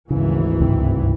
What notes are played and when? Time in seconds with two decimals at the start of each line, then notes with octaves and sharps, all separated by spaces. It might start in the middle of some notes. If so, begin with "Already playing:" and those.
0.10 G#1 D2 C#3 E3
0.60 C#2 G2 C3